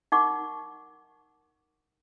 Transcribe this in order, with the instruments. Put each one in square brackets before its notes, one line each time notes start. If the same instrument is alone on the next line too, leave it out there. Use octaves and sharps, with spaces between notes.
[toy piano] D#4 A#4 F#5 C#6 D6